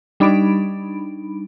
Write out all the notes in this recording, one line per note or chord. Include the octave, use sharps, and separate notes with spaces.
G3 D4 D#4 B5 D7